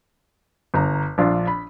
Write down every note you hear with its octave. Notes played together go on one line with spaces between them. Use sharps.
G1 A#5
A#1 D4 F4
B5